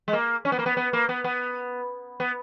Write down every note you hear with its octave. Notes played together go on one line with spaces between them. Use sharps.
G#3
A#3
C#4
B3
A#3
B3
B3
A#3
B3
B3
B3